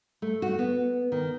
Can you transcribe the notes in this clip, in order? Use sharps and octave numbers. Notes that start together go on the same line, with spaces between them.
A3
F#4
B3
D#3